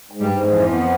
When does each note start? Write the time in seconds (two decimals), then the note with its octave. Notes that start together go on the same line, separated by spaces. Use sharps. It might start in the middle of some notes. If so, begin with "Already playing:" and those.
0.11 G#2
0.20 G2 G3
0.30 G#2
0.49 F2 E3 F3
0.69 B3